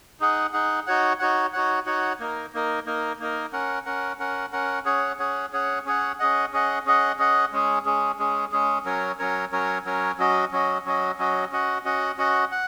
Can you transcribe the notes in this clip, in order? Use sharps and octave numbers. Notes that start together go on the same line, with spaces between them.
D#4 G#4 F#5
D#4 G#4 F#5
D#4 F#4 C#5 F#5
D#4 F#4 C#5 F#5
D#4 F#4 C#5 F#5
D#4 F#4 C#5 F#5
A#3 D#4 A#4
A#3 D#4 A#4
A#3 D#4 A#4
A#3 D#4 A#4
C#4 A#4 F#5
C#4 A#4 F#5
C#4 A#4 F#5
C#4 A#4 F#5
C#4 G#4 C#5 F#5
C#4 G#4 C#5 F#5
C#4 G#4 C#5 F#5
C#4 G#4 C#5 F#5
C#4 G#4 D#5 F#5
C#4 G#4 D#5 F#5
C#4 G#4 D#5 F#5
C#4 G#4 D#5 F#5
G#3 C#4 G#4
G#3 C#4 G#4
G#3 C#4 G#4
G#3 C#4 G#4
F#3 C#4 A#4 C#5
F#3 C#4 A#4 C#5
F#3 C#4 A#4 C#5
F#3 C#4 A#4 C#5
F#3 C#4 F#4 D#5
F#3 C#4 F#4 D#5
F#3 C#4 F#4 D#5
F#3 C#4 F#4 D#5
C#4 F#4 D#5 F#5
C#4 F#4 D#5 F#5
C#4 F#4 D#5 F#5
F#5